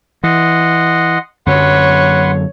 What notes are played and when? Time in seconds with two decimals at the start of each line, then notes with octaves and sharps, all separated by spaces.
0.24 E3 D#5 F#5 C6
1.46 F#2 D3 F#3 B4 C#5 F#5 C6